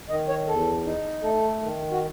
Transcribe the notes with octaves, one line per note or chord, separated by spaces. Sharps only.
D#3 D#5
C#5
E2 A4
D#4
A3 A4
D#3
F#4